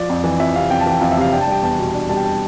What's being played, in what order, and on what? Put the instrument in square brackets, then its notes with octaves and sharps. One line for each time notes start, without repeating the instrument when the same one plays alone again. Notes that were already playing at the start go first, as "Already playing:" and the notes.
Already playing: [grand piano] F3 D5
F2
E3
F2 E5
C3 F5
F2 G5
A5
E3 G5
F2 F5
E5
C3 F5
D4 G5
A5
G3 G5
E2 A5
B2
D4
G3 A5
G5
A5